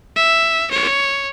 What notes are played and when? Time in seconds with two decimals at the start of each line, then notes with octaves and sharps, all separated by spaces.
0.16 E5
0.71 C#5